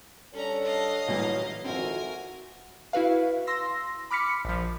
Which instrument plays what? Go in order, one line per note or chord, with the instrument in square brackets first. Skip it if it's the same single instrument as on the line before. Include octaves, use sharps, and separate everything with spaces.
[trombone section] G3 D4 A4 [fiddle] C#4 A#5 [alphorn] C#5
[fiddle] D#5 F5
[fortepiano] A1 A#2 G3 [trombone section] E3 F#3
[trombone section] G#1 F2 [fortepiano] C4 E4 [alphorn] F#4 [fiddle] A#4 G#5
[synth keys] E4 F#4 B4 F5
C6 E6 A#6
B5 D6 F6 B6 C#7
A#1 F3